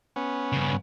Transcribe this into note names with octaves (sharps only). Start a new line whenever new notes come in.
B3 C#4
G2 C#3